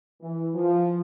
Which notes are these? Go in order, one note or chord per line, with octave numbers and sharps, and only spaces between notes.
E3
F3